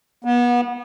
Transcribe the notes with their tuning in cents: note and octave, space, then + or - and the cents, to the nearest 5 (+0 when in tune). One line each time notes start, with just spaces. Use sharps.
B3 -30